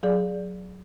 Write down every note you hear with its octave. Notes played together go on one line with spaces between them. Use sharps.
F#3 G#4 D5